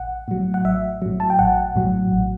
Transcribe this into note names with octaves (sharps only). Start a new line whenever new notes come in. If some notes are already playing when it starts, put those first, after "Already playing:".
Already playing: A1 F#5
A2 F#3
F#5
A1 E5
A2 F#3
A5
G5
A1 F#5
A2 F#3
A1